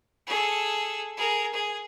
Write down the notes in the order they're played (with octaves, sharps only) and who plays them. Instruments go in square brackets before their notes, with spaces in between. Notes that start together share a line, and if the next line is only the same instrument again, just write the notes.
[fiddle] G#4 A4
G#4 A#4
G#4